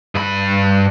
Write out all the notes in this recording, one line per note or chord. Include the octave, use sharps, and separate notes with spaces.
G2 B5